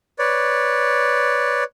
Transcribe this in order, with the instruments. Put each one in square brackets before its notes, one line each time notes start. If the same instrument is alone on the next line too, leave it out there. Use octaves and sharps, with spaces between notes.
[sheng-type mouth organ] B4 C#5 D5